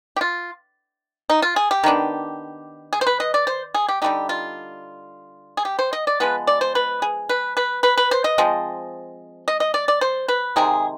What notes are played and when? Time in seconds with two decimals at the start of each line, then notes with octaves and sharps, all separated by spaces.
0.16 G4
0.21 F4
1.30 D#4
1.42 F4
1.56 G#4
1.71 G4
1.84 D#3 B3 D4
2.93 G#4
3.01 C5
3.07 B4
3.20 D#5
3.34 D5
3.47 C5
3.74 G#4
3.88 G4
4.02 D3 G3 C4 D#4 G4
4.29 F4
5.57 G#4
5.65 G4
5.79 C5
5.93 D#5
6.07 D5
6.20 F3 G#3 B3 B4
6.47 D5
6.61 C5
6.75 B4
7.02 G#4
7.29 B4
7.57 B4
7.83 B4
7.97 B4
8.11 C5
8.24 D#5
8.38 F3 G#3 C4
9.48 D#5
9.60 D#5
9.74 D5
9.88 D5
10.01 C5
10.28 B4
10.56 C3 D#3 G#3 C4 G#4